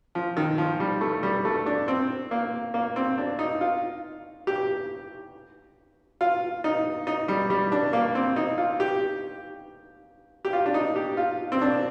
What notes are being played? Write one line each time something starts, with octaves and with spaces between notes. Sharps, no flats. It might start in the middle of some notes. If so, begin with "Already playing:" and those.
F3
D#3
F3
G3
A3
G3
A3
D4
C4
A#3
A#3
C4
D4
D#4
F4
G4
F4
D#4
D#4
G3
G3
D4
A#3
C4
D#4
F4
G4
G4
F4
D4
D#4
G4
F4
C4
D4